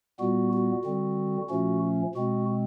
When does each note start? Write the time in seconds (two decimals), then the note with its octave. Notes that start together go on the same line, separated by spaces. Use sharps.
0.20 A#2 G3 B3 F#4
0.53 F#4
0.85 D3 G3 C4
1.50 A#2 F3 A3 C#4 F#4
2.15 B2 G#3 C4 F#4